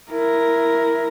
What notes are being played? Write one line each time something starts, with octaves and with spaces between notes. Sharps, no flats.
E4 A#4